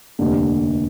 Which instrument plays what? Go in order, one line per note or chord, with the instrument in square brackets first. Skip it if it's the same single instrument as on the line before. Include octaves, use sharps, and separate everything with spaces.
[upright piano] F1 D#2 D3